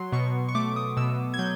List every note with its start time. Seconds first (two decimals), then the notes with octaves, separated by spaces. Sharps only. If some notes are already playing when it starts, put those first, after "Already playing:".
Already playing: F#3 C6
0.12 B2 C#6
0.49 C#6
0.55 A3 D6
0.76 D#6
0.97 B2 E6
1.34 G#6
1.39 F#3 G6